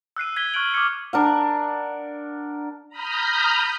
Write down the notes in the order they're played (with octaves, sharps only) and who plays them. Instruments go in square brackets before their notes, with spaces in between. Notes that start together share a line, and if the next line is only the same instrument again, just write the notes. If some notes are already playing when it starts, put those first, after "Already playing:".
[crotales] E6 F#6 C7 D#7
G#6 B6 G7
C#6 F6 F#6 G#6 D7 F#7
D6 D#6 F6 G#6 C#7
[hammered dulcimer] D4 A#4 F#5
[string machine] A#5 B5 D#6 F6 G6